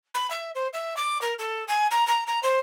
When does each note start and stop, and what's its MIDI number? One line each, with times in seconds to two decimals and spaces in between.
0.14 0.29 83
0.31 0.51 76
0.55 0.67 72
0.73 0.95 76
0.97 1.20 86
1.21 1.34 70
1.39 1.64 69
1.68 1.87 80
1.91 2.06 82
2.07 2.24 82
2.27 2.40 82
2.43 2.59 72